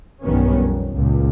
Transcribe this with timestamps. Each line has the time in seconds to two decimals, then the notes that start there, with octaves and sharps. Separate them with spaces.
0.22 B1 G2 D#3 G3 B3 C#4
0.58 F2
0.96 C#2 A#2